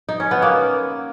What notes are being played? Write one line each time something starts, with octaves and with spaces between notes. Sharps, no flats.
D#4
C#4
B3
A#3